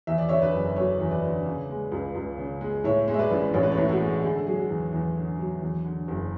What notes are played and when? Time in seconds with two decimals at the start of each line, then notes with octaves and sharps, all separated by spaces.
0.07 E2 E5
0.18 D5
0.29 D3 C#5 E5
0.42 B4 D5
0.53 F#1
0.76 F#3 A4 C#5
1.00 E2
1.11 B4 D5
1.23 D3
1.46 C#3
1.69 G#3
1.92 C#2
2.15 C#2
2.38 C#3
2.61 G#3
2.84 A2 C#5 E5
3.08 G#3
3.14 E5
3.19 B4 D5
3.31 A1
3.54 A1 C#5
3.63 B4
3.71 A4 C#5
3.77 A2
3.88 F#4 A4
4.00 G#3
4.23 D3 G#4
4.35 A4
4.46 F#3 G#4
4.58 F#4
4.69 E2
4.93 E2
5.16 D3
5.39 F#3
5.62 E2
5.85 D3
6.08 F#1